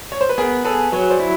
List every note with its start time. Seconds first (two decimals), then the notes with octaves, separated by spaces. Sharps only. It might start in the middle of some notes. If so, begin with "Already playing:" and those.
0.12 C#5
0.21 C5
0.29 B4
0.38 B3 G#4 A#4
0.65 G#4 A4 B4
0.92 F#3 B4 C#5
1.10 C5 D5
1.20 E4